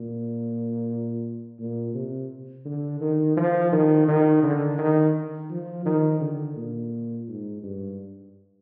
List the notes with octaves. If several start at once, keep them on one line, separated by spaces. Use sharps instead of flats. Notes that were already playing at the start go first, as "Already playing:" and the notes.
Already playing: A#2
A#2
C3
D3
D#3
F3
D#3
D#3
D3
D#3
F3
D#3
D3
A#2
G#2
G2